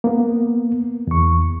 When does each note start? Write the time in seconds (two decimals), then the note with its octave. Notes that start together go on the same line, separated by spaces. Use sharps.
0.04 A#3 B3
1.07 E2 C#6